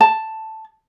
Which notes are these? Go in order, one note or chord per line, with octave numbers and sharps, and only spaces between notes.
A5